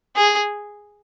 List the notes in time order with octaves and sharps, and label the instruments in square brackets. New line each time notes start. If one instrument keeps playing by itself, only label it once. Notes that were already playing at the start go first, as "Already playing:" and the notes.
[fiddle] G#4